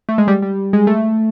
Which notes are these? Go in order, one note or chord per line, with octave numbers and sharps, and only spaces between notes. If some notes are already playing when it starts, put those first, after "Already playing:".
A3
G#3
G3
G3
G#3
A3